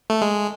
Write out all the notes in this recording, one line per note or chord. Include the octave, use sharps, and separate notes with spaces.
A3
G#3